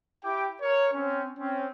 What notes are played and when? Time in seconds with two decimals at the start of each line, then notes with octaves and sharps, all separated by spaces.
0.24 E4 G4 G5 D6
0.61 A#4 C#5
0.94 C4 C#4
1.38 C4 C#4